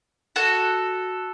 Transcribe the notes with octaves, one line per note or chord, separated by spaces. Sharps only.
F#4 A4